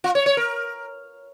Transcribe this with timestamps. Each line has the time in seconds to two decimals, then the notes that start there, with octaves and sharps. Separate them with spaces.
0.04 F4
0.15 C#5
0.26 C#5
0.37 A#4